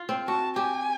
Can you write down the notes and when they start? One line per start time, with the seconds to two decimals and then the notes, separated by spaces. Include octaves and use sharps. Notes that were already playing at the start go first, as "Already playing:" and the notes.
Already playing: F4
0.09 C4
0.28 F#4 A5
0.56 G4 G#5